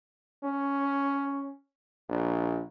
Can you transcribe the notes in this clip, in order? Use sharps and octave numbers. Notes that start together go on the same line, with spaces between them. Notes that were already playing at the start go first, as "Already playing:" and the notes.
C#4
A#1